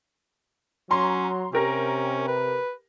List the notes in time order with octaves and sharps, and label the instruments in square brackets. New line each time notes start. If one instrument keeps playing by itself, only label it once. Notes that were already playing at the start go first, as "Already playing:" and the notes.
[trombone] F#3 [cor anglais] C#4 [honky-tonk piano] A#5 C6
[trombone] C3 [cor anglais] C#4 [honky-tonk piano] G4 A#4 A#6
[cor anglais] B4